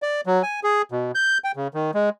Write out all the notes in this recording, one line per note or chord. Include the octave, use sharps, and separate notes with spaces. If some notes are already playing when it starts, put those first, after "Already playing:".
D5
F#3
G#5
G#4
B2
G6
G5
C#3
D#3
G#3